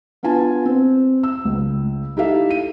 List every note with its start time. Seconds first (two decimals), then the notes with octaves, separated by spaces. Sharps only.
0.23 B3 D4 F4 G#5 A5
0.65 C4
1.23 E6
1.45 C#2
2.17 D#4 E4 G4 A4 E5 F5
2.50 D#7